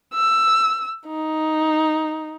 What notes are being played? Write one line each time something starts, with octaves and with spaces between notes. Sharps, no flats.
E6
D#4